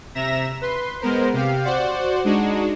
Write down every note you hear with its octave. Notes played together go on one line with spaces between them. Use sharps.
C3 E5 A#5 A#6 E7
B4 C6
G#3 B3 A#4 C5
C3 G4 F5
F#4 C5 D5 F#5
G#3 D4 D#4 F#4